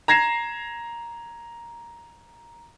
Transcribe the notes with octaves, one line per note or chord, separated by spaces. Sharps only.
A#5 G#6 A#6 C7 E7